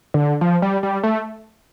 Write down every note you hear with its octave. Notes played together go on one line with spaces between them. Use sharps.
D3
F3
G3
G3
A3